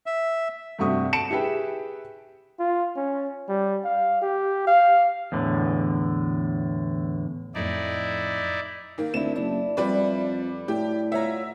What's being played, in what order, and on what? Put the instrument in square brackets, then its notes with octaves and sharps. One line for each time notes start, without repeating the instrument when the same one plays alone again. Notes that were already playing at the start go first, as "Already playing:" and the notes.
[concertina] E5
[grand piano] G2 C3 A3 F#4 C#6 D#6
A5 C#7 D7 E7
E4 G4 G#4 B4 E5 G5
[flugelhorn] F4
C#4
G3
F5
G4
F5
[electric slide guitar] E2 A2 D3
[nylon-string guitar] F2 A2 A3 [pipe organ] D#4 E4 D5
[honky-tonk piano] D#3 A#3
[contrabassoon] D2 [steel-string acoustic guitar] C4 D4 E4 [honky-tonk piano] E7
[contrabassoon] F#1 [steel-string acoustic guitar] D4 E4
[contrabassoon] F2 [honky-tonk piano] G3 B4 D5
[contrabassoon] A2 [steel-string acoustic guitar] D4 [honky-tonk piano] G4
[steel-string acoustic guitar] F4 C#5 F#5 [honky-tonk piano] E5 A#5